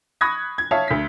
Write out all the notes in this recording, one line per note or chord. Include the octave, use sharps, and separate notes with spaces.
B5 C#6 D#6 F#6 G#6 A#6
G#6
C#5 E5 F5 A5 D#6
D2 B6